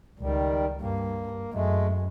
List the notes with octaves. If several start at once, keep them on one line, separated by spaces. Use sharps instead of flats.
C#2 D#3 G3
G2 A#3
F#2 G#3 A3